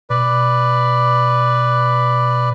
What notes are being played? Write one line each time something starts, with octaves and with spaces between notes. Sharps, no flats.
B2 B4 D5